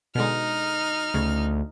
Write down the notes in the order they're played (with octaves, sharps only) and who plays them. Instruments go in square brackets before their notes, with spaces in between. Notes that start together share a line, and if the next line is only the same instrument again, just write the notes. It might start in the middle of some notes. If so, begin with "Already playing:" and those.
[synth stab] B2 D3 G#3 [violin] D#4 F6
[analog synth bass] D2 [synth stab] C#3